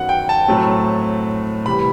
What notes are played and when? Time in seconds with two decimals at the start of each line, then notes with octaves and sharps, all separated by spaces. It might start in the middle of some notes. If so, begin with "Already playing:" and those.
Already playing: F#2 D#3 F#3 B3 F#5
0.09 G5
0.29 A5
0.48 A2 F#3 A3 C4
1.66 C3 E3 G3 B5